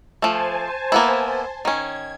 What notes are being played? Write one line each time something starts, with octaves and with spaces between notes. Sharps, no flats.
F3 A3 C5 G#5 A5
A#3 B3 E4
D#3 C#4 G#6